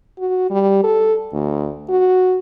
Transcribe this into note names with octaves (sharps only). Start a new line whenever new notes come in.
F#4
G3
A4
D2
F#4